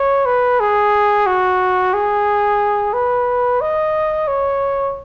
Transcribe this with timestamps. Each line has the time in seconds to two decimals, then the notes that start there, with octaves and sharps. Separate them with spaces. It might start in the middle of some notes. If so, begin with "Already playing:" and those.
Already playing: C#5
0.26 B4
0.60 G#4
1.27 F#4
1.94 G#4
2.94 B4
3.61 D#5
4.28 C#5